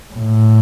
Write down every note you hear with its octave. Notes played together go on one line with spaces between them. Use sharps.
A2